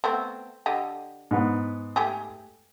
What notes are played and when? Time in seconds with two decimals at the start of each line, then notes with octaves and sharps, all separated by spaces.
0.04 A3 B3 C4
0.66 D3 G4 D#5
1.31 G#2 B3
1.96 A3 G4 G#4